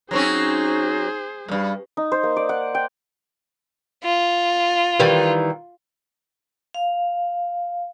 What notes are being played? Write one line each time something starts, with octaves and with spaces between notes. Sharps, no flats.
F#3 C4 C#4 D#4 G#4 C5
G2 A#2 G3
D#4
C5
A#3
D5
F#5
G5
F4
D#3 E3 G3
F5